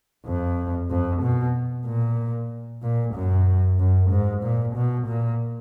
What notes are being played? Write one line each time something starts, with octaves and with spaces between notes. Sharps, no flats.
F2
F2
B2
A#2
A#2
F#2
F#2
G#2
A#2
B2
A#2